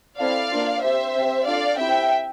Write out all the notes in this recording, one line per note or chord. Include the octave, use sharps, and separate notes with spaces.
C4 E4 A4 D5 F5
A#3 D4 F4
C4 G4 C5 E5
C4 G4
D4 F4 A4 D5 F5
C4 E4 G4 E5 G5